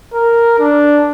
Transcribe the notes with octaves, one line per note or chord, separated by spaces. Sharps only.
A#4
D4